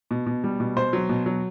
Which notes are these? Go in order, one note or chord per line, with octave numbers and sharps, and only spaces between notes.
B2
B2
G3
B2
B2 C5
F#3
B2
F#3